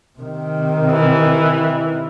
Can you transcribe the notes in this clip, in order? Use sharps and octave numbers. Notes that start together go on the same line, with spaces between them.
C3 D#3
E3